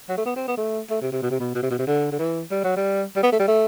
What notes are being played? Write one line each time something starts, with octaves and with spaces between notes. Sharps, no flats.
F#3
A3
B3
C4
B3
A3
A3
C3
C3
B2
C3
B2
B2
C3
B2
C3
D3
D3
E3
G3
F#3
G3
G3
B3
A3
G3
A3